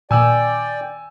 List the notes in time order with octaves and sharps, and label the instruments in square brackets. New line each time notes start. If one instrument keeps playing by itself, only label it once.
[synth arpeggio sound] A#2 D#3 [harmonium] D5 G5 [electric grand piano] G#5 E6